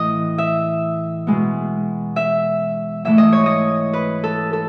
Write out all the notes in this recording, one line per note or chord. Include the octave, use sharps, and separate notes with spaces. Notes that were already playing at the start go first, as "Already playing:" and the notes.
Already playing: A2 E3 D#5
E5
B2 G#3 B3
E5
G#2 E3 A3 E5
D#5
C#5
D#5
B4
A4
A4